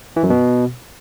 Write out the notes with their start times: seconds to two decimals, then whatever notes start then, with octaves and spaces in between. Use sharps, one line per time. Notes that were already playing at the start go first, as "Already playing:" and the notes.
0.16 E3
0.23 F#2
0.30 B2